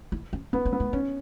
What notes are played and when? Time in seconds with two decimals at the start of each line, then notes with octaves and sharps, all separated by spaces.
0.12 E4
0.33 C#4
0.53 B3 E4
0.65 C#4
0.73 B3
0.80 A3
0.93 B3 C#4